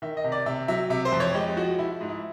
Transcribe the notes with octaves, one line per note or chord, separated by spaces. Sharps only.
D#3 E5
D#5
C3
D5
C3 E5
F#3 E5
C3 E5
C5
F2
C#5
G#3 G4
F3 F#4
F3 E4
G#2
E4